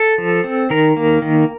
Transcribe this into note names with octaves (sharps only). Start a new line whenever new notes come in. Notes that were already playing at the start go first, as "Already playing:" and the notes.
Already playing: A4
F3
C4
D#3 A#4
A#3
D#3